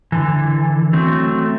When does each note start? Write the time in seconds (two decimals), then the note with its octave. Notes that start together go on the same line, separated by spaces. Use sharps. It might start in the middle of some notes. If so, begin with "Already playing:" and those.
0.12 D3 E3
0.93 F#3 A3 C4